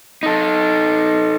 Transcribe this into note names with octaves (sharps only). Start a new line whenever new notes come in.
D#4 A4